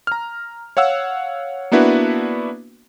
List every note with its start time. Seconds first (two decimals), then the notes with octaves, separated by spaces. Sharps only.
0.07 A#5 F6
0.77 C#5 F5 F#5 E6
1.72 A#3 B3 D4 E4 F#4 B4